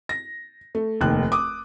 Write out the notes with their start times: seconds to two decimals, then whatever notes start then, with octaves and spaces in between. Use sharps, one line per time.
0.09 A#6
0.75 A3
1.01 F1 D#2 F#6
1.32 D6 D#6